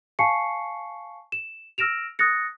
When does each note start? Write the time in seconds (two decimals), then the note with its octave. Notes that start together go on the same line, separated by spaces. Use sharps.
0.19 F5 G#5 A5 C#6 C7 C#7
1.32 E7
1.78 E6 F6 A#6 D7 E7 F7
2.19 D#6 F#6 A6 A#6 C#7